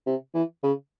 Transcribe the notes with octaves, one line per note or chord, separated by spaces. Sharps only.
C3
E3
C#3